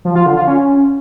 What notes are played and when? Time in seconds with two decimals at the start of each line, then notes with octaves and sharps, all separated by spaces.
0.05 F3
0.15 F4
0.26 D3
0.37 F4
0.47 C#4